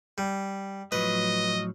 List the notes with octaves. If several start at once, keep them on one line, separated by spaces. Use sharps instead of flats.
G3
A2 F3 F#3 B4 D#5